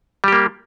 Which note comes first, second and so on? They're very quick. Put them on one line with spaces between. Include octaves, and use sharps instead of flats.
G3 G4 A#3